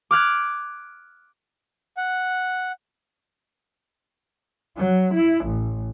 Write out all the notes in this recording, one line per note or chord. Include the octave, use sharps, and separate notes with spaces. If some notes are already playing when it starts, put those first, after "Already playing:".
D6 F6 F#6 G#6
F#5
F#3
E4
A1